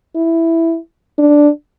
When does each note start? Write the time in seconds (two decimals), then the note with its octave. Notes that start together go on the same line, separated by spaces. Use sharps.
0.16 E4
1.19 D4